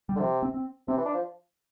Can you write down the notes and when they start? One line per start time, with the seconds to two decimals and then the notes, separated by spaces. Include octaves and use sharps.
0.09 G3
0.16 D3
0.20 C3 F3
0.43 C4
0.54 C4
0.88 C3 C4
0.97 E3
1.05 D4
1.14 F3